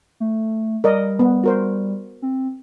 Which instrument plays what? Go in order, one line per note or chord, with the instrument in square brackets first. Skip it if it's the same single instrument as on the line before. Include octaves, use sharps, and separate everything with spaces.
[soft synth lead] A3
[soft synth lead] G3 [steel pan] A#4 D5 D#5
[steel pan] B3
F#4 A#4 C5
[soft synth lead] C4